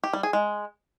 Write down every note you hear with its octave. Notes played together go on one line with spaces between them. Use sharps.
G4
G3
G#4
G#3